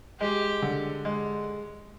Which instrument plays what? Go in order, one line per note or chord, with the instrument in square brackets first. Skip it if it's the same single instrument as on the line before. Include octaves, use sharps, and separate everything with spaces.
[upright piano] G#3 [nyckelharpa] G4
[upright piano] D3
G#3